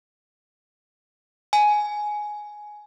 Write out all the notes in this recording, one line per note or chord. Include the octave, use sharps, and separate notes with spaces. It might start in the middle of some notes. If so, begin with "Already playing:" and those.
G#5